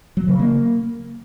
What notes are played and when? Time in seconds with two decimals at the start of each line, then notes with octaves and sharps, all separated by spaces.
0.17 F#3
0.28 C#3
0.39 A#3